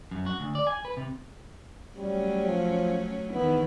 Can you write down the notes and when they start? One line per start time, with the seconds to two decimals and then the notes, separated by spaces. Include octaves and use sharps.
0.11 F#2
0.26 F#4
0.40 D2
0.55 D5
0.67 G#5
0.85 B4
0.97 C3
1.97 F#3 G3 A3 C#4
2.47 F3
3.33 E2 D#3 B3 E4